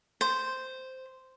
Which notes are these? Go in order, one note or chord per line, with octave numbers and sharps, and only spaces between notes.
C5